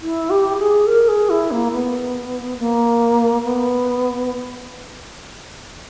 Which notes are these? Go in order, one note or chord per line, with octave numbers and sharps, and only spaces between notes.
E4
G4
G#4
A#4
G#4
E4
A#3
B3
A#3
B3